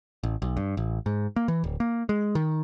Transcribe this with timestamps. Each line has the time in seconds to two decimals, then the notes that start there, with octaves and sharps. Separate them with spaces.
0.23 A1
0.42 B1
0.57 G2
0.77 A1
1.06 G#2
1.36 A#3
1.48 E3
1.64 D1
1.80 A#3
2.09 G#3
2.35 D#3